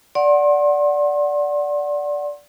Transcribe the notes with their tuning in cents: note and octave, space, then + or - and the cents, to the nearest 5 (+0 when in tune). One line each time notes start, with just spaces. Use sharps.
D5 -10 F#5 +0 C6 +35